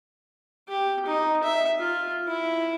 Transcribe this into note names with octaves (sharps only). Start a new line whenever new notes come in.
G4
D#4
E5
F4
E4